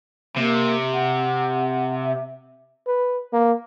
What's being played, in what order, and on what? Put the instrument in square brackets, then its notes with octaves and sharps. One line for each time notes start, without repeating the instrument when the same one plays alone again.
[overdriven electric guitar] C3 [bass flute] A#3
[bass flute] F#5
E5
[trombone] B4
A#3